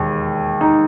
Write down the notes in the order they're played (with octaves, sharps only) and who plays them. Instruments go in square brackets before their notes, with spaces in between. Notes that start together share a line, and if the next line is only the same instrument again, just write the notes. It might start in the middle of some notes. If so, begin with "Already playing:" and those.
Already playing: [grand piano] E1 D#2
D#4